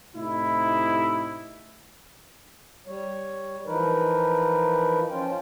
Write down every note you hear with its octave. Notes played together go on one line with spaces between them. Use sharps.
A2 C3 D#4 E4
G3 C#5
E3 F3 D#4 A#4 B4
F3 C#4 F4 G5